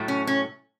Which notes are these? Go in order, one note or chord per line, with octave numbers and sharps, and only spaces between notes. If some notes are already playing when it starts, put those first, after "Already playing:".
Already playing: A2 F#3 A3
C#4
C#4